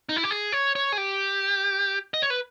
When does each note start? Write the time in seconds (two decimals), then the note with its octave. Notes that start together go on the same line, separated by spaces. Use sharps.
0.09 D#4
0.16 E4
0.24 G4
0.30 G#4
0.52 C#5
0.75 C#5
0.92 G#4
0.98 G4
2.14 D#5
2.22 C#5
2.30 B4